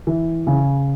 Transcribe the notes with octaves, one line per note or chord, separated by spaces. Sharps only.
E3
C#3